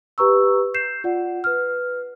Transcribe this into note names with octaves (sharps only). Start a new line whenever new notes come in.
G4 B4 A#5 C#6 E6
G6 C7 E7
F4 D5 F#5
B4 F6